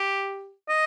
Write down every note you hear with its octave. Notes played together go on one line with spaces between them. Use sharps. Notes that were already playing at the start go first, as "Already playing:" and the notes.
Already playing: G4
D#5